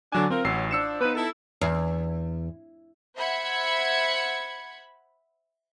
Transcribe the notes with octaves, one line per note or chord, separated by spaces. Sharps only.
D3 F#3 D4 G#5
C4 F4 A#4
A1 F#3 E6 C7
F3 D4 E6 C#7 E7
F3 B3 D#4 B4
E4 A4
E2
C5 E5 F#5 B5 G#6 C#7